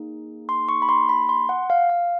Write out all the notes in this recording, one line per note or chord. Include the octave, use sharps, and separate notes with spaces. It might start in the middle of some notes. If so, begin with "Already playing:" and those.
Already playing: A#3 D#4 G#4
C6
C#6
B5
C6
B5
C6
F#5
F5
F5